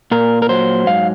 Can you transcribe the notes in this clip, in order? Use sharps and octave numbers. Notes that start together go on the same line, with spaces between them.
A#2 A#4
A#4
F#3 C5
G#2 F5